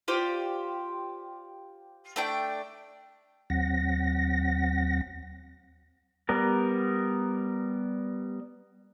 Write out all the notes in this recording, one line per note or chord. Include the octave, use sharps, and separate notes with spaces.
F4 G4 C5 D5
A3 D4 G5
D#2 F#3 C4 F#5 A#6
G3 B3 A#4